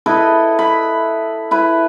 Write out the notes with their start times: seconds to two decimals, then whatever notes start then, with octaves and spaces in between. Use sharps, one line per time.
0.06 E4 A4 B4 D#5
0.59 B5
1.51 E4 B4